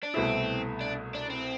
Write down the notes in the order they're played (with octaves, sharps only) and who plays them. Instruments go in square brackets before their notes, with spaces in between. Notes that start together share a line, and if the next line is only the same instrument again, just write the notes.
[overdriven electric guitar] D4
[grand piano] C2 B2 A3 E4 [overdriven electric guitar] C4
[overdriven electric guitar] D4
D4
C4